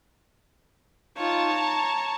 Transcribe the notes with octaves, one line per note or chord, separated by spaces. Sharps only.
D#4 F4 C#5 A5
A#5